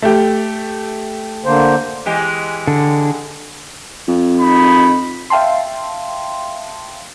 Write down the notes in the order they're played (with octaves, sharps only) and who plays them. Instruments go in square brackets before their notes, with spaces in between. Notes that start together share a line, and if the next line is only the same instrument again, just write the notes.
[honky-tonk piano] A3 G4
[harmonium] D3 A#3 C5
[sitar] E3 G#3 G4
[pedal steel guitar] D3
[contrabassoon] F2
[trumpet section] D#4 B5
[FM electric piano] E5 F5 G5 A5 C6